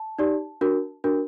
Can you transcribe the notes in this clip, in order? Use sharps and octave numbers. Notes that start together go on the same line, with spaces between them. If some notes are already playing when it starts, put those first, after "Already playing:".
Already playing: A5
D#4 G4 D5
D4 F#4 A#4
D4 F#4 A#4